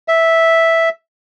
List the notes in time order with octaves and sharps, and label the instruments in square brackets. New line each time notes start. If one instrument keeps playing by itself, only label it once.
[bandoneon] E5